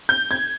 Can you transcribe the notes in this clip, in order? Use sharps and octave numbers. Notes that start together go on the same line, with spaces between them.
G6
G#6